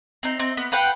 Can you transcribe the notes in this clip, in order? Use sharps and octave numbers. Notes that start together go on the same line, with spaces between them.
C4 D#4
C4 D#4
B3
F4 B4 F#5 G5